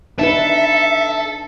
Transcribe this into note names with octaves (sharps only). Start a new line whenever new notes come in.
D4 D#4 A4 B4 E5